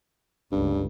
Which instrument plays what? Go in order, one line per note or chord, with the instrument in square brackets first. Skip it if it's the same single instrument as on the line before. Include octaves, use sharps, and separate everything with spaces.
[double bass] G1 C#2 [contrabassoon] G2